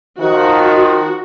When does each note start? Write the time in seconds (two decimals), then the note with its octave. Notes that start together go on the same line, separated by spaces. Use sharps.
0.19 D#3 F3 F#4